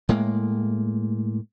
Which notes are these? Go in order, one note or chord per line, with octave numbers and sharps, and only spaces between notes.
A2 G#3 A#3